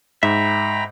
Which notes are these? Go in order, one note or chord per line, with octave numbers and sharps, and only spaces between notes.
G#2 E5 G5 A#5 B5